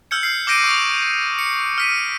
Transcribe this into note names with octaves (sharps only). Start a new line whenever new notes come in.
E6 F6 G6 G#6 C#7
C7
D6 F6 G6 A#6 D7 D#7
C#6 D#6
C#7
F6 B6 D#7